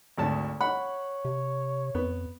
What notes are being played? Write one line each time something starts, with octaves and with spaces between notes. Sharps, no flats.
G#1 D2 A5
C#5 F#5 B5
C3
F2 B3